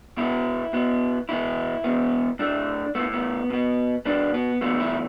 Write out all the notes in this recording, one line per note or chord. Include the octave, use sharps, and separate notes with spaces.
B2 B3 E4
B2 B3
E2 B2 B3 E4
E2 B2 B3
A2 A3 D4
A2 A3 B3
B3
B2 B3
B2 B3 D4
B3
E2 B2 A3 B3
E4